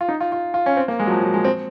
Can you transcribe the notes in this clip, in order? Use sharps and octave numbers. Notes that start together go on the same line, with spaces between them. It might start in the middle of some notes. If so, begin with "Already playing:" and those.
F4
D#4
F4
F4
F4
C#4
C4
A#3
G#3
F#3
F3
F#3
G#3
C4